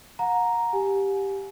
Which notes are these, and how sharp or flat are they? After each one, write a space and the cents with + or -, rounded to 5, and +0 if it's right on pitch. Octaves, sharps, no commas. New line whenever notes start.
F#5 -35 A#5 +0
G4 +0 G#5 +25